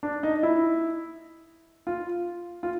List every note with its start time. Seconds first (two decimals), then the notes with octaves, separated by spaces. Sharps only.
0.03 D4
0.23 D#4
0.43 E4
1.87 F4
2.63 F4